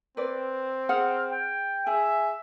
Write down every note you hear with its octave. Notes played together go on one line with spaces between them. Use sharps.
C4 B4 D5
G#4 F#5 F6
G5
G#4 E5 G#5